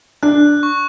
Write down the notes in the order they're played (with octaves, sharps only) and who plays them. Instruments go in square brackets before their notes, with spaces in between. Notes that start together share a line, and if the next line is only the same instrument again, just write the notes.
[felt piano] D4 [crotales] F#6
[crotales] C#6